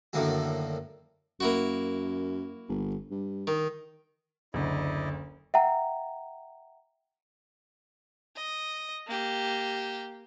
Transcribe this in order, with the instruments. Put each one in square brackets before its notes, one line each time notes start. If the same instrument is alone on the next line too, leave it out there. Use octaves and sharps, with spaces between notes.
[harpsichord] F#2 A2 D3 D#3 A#3 F#4
[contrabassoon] F#2 [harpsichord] A#3 E4 F#4
[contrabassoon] G1
G2
[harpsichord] D#3
[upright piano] F#1 [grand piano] D2 [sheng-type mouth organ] E4 D5 D#5
[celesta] E5 F#5 G5 A#5
[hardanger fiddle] D#5
A#3 G4